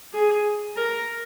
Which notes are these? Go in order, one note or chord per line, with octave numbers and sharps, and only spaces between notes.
G#4
A#4